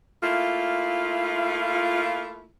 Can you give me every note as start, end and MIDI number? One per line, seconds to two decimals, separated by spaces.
0.23 2.48 57
0.23 2.48 58
0.23 2.48 64
0.23 2.48 65